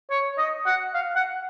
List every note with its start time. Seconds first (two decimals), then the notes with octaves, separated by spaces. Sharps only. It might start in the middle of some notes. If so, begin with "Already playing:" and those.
0.10 C#5
0.38 D#5
0.66 F#5
0.94 F5
1.16 F#5